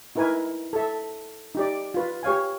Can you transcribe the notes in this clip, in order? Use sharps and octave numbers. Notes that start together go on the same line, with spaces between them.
D#4 E4 A#4 B4 G#5
A4 E5
D#4 G4 D5
F4 B4
G4 C#5 F5 G#5